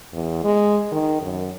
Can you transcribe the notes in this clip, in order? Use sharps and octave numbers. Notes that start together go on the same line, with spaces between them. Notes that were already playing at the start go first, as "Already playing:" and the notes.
E2
G#3
D#3
F#2